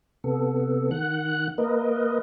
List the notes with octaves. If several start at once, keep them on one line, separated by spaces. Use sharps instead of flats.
C3 B3 A4
D#3 F#5 F#6
A#3 A#4 B4 D#5